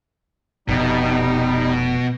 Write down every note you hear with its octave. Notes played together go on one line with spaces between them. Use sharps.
F1 B2 G3 D#4